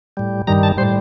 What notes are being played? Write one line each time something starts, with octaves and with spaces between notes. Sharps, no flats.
A2 G3
G2 D#3 G3 A#5
A5
A2 G3 C5